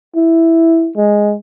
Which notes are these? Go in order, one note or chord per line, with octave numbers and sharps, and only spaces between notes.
E4
G#3